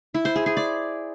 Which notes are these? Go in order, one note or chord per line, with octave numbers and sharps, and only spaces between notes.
E4
C5
G#4
G#4
D5